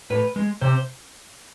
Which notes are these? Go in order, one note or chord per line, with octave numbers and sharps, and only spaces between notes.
A2 B4
G#3
C3 C5